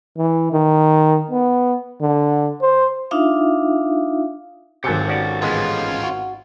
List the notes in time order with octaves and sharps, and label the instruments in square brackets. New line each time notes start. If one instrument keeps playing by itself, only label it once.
[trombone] E3
D#3
B3
D3
C5
[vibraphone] D4 D#4 F4 E5 F5
[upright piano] G#1 G#5 C#7 [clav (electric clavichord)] C3 F#3 [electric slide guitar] G4 A4
[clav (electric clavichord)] C#4 F#4 D5
[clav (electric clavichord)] A1 G#3 B3 [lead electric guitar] C#4 F4
[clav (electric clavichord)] F#4